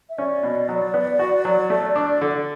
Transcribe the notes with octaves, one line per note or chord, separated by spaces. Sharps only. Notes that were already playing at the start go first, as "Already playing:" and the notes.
E5
C#4 D5
B2
F#3
B3
F#4
F#3
A3
D4
D3